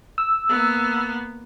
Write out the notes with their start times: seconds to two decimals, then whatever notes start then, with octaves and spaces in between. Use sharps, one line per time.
0.18 E6
0.49 A#3 B3